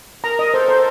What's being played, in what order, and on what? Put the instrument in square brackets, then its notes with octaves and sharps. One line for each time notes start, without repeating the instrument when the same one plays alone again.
[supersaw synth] A#4 [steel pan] A#5
[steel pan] D#5
[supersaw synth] A4 [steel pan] C5
[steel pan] C5